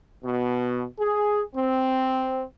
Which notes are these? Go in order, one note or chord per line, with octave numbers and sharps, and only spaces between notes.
B2
G#4
C4